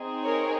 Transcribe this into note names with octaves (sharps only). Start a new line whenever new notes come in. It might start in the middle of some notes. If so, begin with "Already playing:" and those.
Already playing: C4 D#4 G#4
A#4 C#5